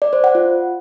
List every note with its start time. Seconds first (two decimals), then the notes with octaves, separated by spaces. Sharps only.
0.02 D5
0.13 C5
0.24 F#5
0.35 F4